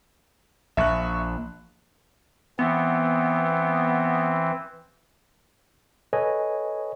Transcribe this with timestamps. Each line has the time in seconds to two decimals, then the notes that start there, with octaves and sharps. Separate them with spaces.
0.77 A#1 E5 C#6 F#6
2.59 E3 B3 C4
6.13 A4 B4 C#5 D#5 G#5